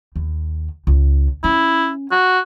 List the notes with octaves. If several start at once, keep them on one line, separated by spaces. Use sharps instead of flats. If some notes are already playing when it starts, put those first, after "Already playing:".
D#2
C#2
C#4 E4
F#4